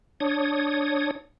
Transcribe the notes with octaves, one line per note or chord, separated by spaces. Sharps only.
D4 C#5 D#6